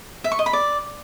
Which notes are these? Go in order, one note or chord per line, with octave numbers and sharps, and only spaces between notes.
E5
C#6
D#5
B5
D5